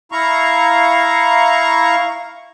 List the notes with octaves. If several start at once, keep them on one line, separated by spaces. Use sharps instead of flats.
E4 F5 A#5 C#6